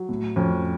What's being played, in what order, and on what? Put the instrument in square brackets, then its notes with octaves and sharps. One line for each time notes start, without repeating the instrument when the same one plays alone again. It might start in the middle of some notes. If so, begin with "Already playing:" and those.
Already playing: [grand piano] F#3
A2
[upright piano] F2 [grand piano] C#4